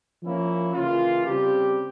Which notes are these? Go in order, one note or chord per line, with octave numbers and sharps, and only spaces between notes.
F3 A#3 C#4 E4
C#3 E3 A#3 F4
C#3 G3 C4 G4